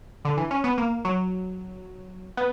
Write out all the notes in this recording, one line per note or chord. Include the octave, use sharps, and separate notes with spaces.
D3
E3
C#4
B3
A#3
F#3
B3